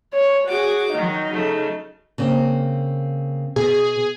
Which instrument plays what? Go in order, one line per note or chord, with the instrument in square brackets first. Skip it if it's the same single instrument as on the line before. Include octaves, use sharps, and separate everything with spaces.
[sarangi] C#5
[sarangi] F#4 [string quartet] G#4 D6
[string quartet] D#3 F#3 [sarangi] D#4
[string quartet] C#3 F#3 A3
[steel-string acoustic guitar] C#3 A#3 C4
[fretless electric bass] B2 [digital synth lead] G#4